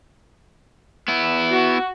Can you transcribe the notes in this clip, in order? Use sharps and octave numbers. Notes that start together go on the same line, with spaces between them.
B3 E4
F#4